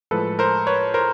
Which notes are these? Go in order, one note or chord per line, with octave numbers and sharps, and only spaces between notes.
A2 F3 G#3 A4 B4
A#4 C5
B4 C#5
A#4 C5